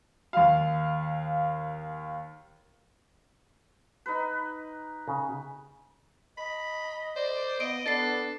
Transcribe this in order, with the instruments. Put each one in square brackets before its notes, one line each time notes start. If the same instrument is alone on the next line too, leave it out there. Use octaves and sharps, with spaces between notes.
[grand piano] D#2 F5
[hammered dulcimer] D#4 B4
[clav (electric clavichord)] C#3
[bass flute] D#5 [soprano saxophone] B5
[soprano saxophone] C5 [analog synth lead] D5
[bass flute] B3 [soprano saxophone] D#5 [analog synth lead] D#6 [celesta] D7
[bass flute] B3 [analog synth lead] D4 [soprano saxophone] A4 [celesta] A6 C7